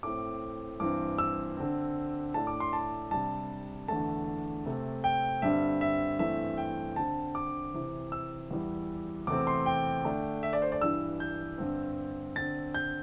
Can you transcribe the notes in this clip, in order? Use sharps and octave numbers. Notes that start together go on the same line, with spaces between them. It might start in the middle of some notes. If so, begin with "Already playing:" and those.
A2 A3 C4 D6
G2 E3 C4 D6
E6
D3 C4
A2 A3 D4 A5
D6
C6
A5
C3 G3 D4 A5
E2 D3 A3 A5
C3 A3 C4
G5
G2 D3 G3 C4 E5
E5
G2 E3 A3 C4 E5
G5
D3 C4 A5
D6
C3 E3 C4
E6
E2 E3 G3
E2 C3 A3 C4 D6
C6
G5
D3 A3 D4
E5
D5
C5
D5
G2 E3 G3 D4 E6
G6
G2 D3 C4
D3 C4 A6
G6